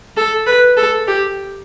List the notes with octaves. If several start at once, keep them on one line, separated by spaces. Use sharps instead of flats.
A4
B4
A4
G4